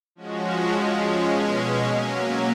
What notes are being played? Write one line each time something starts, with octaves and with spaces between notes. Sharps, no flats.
F3 G#3 C#4 F#4
F3 G#3 C#4
B2 G#3 C#4
F#3 A#3 C#4